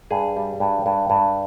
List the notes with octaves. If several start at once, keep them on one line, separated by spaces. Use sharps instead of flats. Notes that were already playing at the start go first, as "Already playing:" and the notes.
G2 G#4
G3
G2
G2
G2